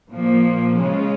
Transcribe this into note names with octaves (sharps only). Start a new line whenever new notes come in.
A#2 F3 A#3
C#3 G#3 C#4 F4